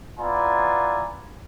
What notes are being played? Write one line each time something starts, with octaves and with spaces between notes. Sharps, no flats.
B3 E4 F4 D5 G#5 A#5